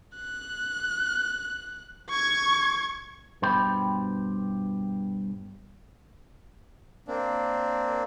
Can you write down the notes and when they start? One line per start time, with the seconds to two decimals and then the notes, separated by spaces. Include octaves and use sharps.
0.16 F#6
2.09 C#6 G#6
3.42 G2 B2 G4 C5 G5 B5
7.06 A#3 C4 D4